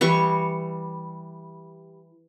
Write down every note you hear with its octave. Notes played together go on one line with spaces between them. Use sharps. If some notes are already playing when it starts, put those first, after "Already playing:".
E3 G3 C#6